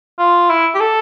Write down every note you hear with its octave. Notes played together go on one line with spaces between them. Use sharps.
F4
E4
G4
A4